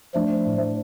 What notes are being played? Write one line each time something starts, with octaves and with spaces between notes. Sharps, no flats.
F3 A3 D4
A2